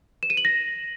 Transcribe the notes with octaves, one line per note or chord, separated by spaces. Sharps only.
E7
D#7
F#7
A#6